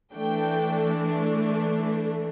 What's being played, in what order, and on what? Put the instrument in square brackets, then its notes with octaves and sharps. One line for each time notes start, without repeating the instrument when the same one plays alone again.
[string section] E3 A3 D4 G5